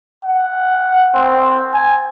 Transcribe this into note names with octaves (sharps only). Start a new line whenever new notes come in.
F#5
C4
G#5